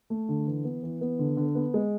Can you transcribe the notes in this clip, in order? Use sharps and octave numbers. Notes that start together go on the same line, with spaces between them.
A3
D3
E3
B3
E3
B3
D3
D3
B3
G#3